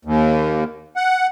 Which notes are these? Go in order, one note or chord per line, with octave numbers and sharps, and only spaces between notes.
D#2
F#5